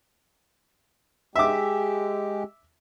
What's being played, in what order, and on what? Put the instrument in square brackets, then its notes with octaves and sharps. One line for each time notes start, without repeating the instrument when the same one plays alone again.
[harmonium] G#3 G4 [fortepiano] E5 D6